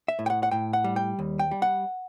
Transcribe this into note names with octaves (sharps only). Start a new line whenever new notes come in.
E5
A2
G5
F#5
F#5
A2 G5
F#5
G3
G5
D#2
G5
G3
F#5